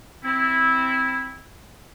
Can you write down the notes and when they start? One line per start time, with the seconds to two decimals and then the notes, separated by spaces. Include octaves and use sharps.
0.24 C4 E4